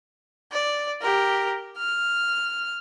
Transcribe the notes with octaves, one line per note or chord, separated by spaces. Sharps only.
D5
G4 A#4
F6